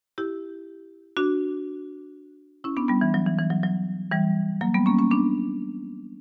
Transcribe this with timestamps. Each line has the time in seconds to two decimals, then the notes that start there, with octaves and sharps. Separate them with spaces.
0.18 E4 G4
1.17 D4 F#4
2.64 C#4 E4
2.77 B3 D4
2.89 G3 B3
3.01 E3
3.14 F#3
3.26 E3
3.38 E3
3.50 F#3
3.63 F#3
4.12 E3 G3
4.61 F#3 A#3
4.74 G3 B3
4.86 A#3 C#4
4.99 A#3 C#4
5.11 B3 D4